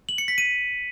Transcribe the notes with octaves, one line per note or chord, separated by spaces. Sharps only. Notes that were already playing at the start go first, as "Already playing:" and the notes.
F#7
C#7
B6
D#7